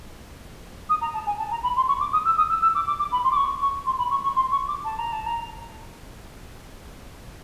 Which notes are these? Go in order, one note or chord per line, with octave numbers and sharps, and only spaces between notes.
D#6
A#5
A5
G#5
A5
A#5
B5
C6
C#6
D6
D#6
E6
D#6
E6
E6
D6
D6
D6
B5
C6
D6
C#6
C#6
C6
B5
C#6
C#6
C6
C#6
D6
A5
A#5
A5
A#5